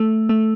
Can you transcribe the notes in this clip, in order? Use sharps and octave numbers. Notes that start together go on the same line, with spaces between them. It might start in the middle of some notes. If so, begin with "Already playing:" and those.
Already playing: A3
A3